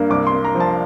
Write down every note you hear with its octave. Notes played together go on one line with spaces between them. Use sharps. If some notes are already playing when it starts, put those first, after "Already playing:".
Already playing: G2 A#3
C2 D6
C6
A#3
A#5
F3
A5